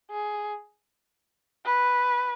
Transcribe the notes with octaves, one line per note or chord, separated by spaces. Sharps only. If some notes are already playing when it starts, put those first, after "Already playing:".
G#4
B4